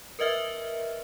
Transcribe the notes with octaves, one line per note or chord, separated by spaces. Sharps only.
A#4 B4 D#5 E5 F6